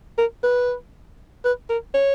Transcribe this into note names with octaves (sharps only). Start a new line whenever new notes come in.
A#4
B4
B4
A#4
C#5